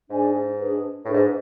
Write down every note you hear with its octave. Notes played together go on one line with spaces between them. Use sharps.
G#2 D4 G#4 D5 G#5
D4 G#4 B4
A2 D4 G#4 B4
G#2